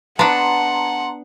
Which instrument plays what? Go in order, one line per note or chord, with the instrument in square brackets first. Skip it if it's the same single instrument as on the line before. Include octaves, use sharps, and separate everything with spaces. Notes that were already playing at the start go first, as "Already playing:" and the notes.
[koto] B3 D4 [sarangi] F#5 [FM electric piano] A5 A#5 C6